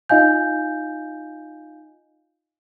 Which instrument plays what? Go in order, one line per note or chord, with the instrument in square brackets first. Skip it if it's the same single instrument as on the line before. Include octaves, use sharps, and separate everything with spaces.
[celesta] D#4 F4 D#5 F5 G#5 G6